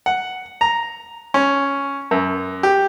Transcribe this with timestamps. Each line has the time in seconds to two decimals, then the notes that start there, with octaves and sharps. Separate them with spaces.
0.06 F#5
0.61 A#5
1.34 C#4
2.11 F#2
2.63 G4